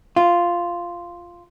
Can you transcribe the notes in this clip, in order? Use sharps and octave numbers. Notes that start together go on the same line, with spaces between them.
F4